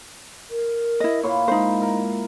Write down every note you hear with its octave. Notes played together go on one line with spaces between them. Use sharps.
A#4
E4 D#5
A#2 E4 C#5 C6
G#3 D#4 C5
A#4